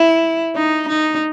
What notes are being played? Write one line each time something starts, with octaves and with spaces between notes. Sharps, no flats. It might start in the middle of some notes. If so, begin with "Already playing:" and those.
Already playing: E4
D#4
D#4